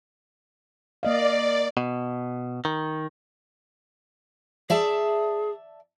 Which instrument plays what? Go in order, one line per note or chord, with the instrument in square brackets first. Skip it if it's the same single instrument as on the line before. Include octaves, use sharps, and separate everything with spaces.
[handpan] A#3 D#5 F5 [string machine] D5
[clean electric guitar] B2
D#3
[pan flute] G#4 [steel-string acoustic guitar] D5 E5 A5